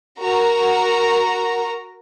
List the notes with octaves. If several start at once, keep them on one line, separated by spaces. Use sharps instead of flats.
F#4 A#4 A#5